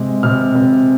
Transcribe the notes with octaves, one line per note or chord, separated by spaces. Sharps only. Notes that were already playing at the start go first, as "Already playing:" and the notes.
Already playing: C3 G#3
C3 F6
C3